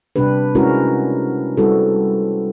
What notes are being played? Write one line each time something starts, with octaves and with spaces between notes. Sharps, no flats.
C3 G3 D4 G4 B4
G#3 C4 C#4 E4 F#4 A#4
G3 C4 E4 F#4 A4 B4